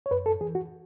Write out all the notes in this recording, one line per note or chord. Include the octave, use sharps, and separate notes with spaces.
C#5
F#2 B4
A4
E3 G#4
F#4